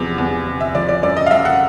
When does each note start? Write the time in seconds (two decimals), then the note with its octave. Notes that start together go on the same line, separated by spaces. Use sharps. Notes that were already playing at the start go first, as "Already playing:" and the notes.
Already playing: E2 C3 F3
0.18 E2
0.47 C3
0.60 E5
0.75 F3 D5
0.89 D5
1.03 F#2 D5
1.17 D#5
1.26 F5
1.31 F#2 E5
1.45 F#5